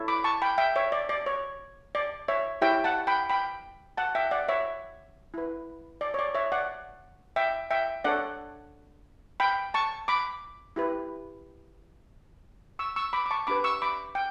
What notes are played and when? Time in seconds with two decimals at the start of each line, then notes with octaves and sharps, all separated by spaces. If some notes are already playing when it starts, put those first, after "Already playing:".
Already playing: E4 A4 C#5
0.08 B5 D6
0.24 A5 C#6
0.42 G5 B5
0.58 E5 G5
0.76 C#5 E5
0.92 D5
1.09 D5
1.26 C#5
1.95 D5
2.28 C#5 E5
2.61 E4 G4 C#5 E5 G5
2.84 F#5 A5
3.07 G5 B5
3.30 G5 B5
3.97 F#5 A5
4.15 E5 G5
4.31 D5 F#5
4.48 C#5 E5
5.34 E4 B4
6.01 D5
6.14 C#5
6.19 D5
6.34 C#5 E5
6.52 D5 F#5
7.36 E5 G5
7.70 E5 G5
8.04 D4 A4 C#5 D5 F#5
9.40 G5 B5
9.74 A5 C#6
10.08 B5 D6
10.76 E4 G4 B4
12.79 C#6 E6
12.96 C#6 E6
13.13 B5 D6
13.26 D6
13.31 A5 C#6
13.47 D4 G4 B4 B5 D6
13.64 C#6 E6
13.82 B5 D6
14.15 G5